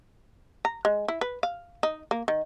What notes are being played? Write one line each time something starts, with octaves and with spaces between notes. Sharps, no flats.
A#5
G#3
E4
B4
F5
D#4
A#3
D#3